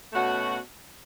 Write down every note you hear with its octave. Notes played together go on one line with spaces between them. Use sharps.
B2 A3 C#4 F#4